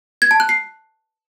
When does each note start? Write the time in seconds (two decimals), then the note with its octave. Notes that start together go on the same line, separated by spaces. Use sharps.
0.22 G#6
0.31 A5
0.40 F#6
0.49 C7